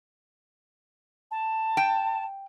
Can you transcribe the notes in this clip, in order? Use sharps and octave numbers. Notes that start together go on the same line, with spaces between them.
A5
G5